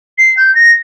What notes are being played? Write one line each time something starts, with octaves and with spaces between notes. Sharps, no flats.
C7
G6
A#6